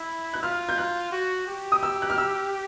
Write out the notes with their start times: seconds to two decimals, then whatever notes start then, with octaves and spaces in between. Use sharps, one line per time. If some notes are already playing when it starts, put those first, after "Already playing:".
Already playing: E4
0.34 F#6
0.43 F4 F6
0.69 G6
0.78 F#6
1.12 F#4
1.47 G4
1.72 D#6
1.83 E6
2.02 F#6
2.10 F6
2.18 E6